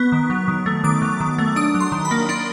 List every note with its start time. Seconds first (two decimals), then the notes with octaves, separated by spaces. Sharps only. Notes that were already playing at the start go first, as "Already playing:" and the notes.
Already playing: B3 C#6
0.12 D#3
0.30 F#3
0.48 D#3
0.66 A3
0.84 D#3 D6
1.02 F#3
1.20 D#3
1.38 A3
1.56 D4 D#6
1.75 F#3
1.80 C6
1.92 D#3
2.05 B5
2.11 A#3
2.29 D4 C6